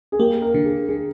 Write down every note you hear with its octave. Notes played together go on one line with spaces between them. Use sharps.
G#4
A#3 G4
A#4
D3
G#4
D3 G#4